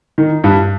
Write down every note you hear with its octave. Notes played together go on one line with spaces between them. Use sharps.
D#3
G2